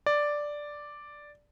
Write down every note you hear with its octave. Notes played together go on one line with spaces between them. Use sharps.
D5